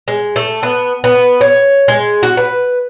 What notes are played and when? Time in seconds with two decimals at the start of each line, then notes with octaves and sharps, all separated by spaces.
0.08 G#3
0.36 A3
0.63 B3
1.04 B3
1.41 C#5
1.88 G#3
2.23 F#4
2.37 B4